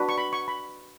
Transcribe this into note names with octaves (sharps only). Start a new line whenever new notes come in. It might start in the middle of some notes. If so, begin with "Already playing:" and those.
Already playing: D4 F#4 B4
C#6
B5
C#6
B5